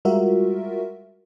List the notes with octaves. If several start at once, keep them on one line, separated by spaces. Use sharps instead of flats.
G3 G#3 F4 F#4 A#4 E5